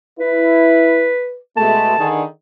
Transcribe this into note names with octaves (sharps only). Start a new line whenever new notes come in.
E4 B4
B2 G#3 A3 A5
D3 D#3 G#4